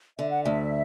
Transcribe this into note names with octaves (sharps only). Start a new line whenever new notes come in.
D3 E5
F#5
D2 E5